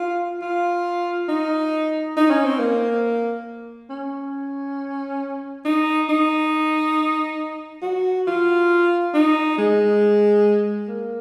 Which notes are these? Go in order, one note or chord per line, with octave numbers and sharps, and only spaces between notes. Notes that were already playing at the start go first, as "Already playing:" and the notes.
Already playing: F4
F4
D#4
D#4
C#4
C4
A#3
C#4
D#4
D#4
F#4
F4
D#4
G#3
A#3